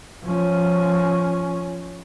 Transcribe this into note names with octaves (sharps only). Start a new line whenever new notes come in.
F3 C#4